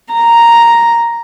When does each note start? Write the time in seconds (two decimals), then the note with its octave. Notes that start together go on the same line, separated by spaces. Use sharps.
0.14 A#5